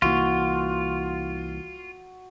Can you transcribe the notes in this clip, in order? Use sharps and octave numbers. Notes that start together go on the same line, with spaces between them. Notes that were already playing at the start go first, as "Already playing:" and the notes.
C2 E3 A#3 F4 F#4